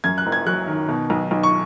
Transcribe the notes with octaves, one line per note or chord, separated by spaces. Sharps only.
F#2 G#6
F#6
F#1
G#6
F#3 F#6
D#3
B2
B1
B1
C#6